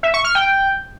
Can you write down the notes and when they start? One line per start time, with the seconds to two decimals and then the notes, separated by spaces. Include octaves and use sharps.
0.03 E5
0.14 C#6
0.25 F6
0.35 G5